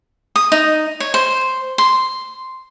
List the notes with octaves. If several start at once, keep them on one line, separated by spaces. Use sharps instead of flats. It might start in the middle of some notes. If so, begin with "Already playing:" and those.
D#6
D#4
C#5
C5
C6